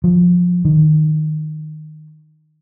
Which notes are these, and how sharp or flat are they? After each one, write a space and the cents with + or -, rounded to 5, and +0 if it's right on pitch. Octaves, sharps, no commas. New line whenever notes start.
F3 +20
D#3 -15